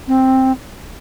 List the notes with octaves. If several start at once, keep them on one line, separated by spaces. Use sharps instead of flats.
C4